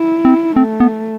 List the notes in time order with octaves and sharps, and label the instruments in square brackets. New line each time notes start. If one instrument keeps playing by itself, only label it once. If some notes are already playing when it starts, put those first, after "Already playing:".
Already playing: [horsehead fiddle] E4
[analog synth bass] C4
[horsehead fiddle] A3 [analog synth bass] C4
[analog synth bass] B3